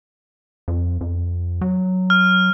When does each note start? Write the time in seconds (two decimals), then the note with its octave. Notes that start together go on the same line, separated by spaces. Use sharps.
0.68 F2
1.01 F2
1.61 F#3
2.10 F6